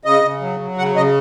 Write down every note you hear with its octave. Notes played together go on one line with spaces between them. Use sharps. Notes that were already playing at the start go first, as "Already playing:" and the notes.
C#3 D#5
C#3
F#3
F#3
C#3 F#5
C#3 D#5